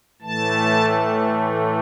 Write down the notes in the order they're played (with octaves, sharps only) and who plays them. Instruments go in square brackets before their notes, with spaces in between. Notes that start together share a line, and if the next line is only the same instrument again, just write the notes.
[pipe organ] A2 E3 A3 A5